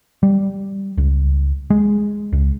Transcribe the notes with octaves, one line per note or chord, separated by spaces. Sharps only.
G3
C#2
G#3
C#2